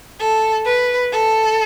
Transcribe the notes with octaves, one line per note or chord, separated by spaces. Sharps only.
A4
B4
A4